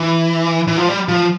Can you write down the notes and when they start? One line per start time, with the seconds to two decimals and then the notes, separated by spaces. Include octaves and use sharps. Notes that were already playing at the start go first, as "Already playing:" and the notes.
Already playing: E3
0.68 E3
0.78 F3
0.89 G3
1.09 F3